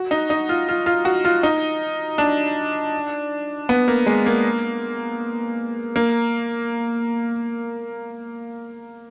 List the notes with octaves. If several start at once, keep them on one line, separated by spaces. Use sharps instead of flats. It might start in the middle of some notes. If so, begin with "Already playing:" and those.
Already playing: F#4
D#4
D#4
F4
F4
F4
F#4
F4
D#4
D4
B3
A#3
G#3
A#3
A#3